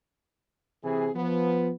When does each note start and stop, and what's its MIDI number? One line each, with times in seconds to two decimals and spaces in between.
0.84 1.09 48
0.84 1.09 52
0.84 1.09 68
1.14 1.71 53
1.14 1.71 59